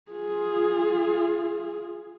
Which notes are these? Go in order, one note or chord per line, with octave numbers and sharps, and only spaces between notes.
F4 G#4